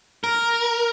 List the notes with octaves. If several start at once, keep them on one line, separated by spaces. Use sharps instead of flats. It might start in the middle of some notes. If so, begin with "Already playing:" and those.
A#4